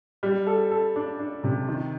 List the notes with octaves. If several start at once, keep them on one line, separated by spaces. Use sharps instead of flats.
G3
A4
A4
D4
D4
C3
D#3